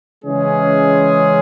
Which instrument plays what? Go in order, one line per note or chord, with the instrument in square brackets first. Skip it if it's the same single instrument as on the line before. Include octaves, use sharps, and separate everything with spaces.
[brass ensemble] C#3 E3 G#3 C#4 G#4